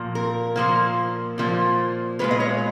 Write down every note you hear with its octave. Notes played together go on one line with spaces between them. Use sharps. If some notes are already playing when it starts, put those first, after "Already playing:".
Already playing: A#2 F3 A#3
A#4
A#2 F3 A#3
A#2 F3 A#3
A#2 G#3 B3 B4
D#5
C#5